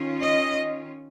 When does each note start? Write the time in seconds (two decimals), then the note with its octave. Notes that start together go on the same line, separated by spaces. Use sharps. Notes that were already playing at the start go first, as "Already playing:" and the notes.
Already playing: D#3 C#4 F4
0.21 D#5